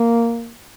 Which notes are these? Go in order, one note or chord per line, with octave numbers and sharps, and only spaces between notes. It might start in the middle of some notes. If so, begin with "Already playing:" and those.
Already playing: A#3